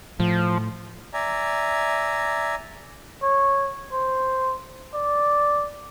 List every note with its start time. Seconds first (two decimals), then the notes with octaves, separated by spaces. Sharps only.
0.20 A2 F3
1.13 D5 E5 G#5 A#5
3.22 C#5
3.92 C5
4.94 D5